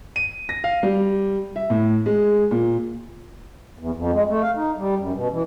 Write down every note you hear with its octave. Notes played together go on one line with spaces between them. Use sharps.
D#7
A#6
F5
G3
E5
A2
G#3
A#2
E2
F2
G#3
A3
F5
D#4
G3
F#2
B2
E3